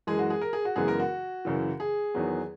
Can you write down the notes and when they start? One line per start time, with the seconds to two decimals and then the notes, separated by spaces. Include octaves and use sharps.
0.07 F#2 E3 G#3 G#4
0.19 F#4
0.30 G#4
0.41 A#4
0.53 G#4
0.65 F#4
0.76 F#2 C#3 E3 G#3 B3 G#4
0.88 A#4
1.00 F#4
1.45 F#2 C#3 E3
1.80 G#4
2.14 E2 D#3 F#3 B3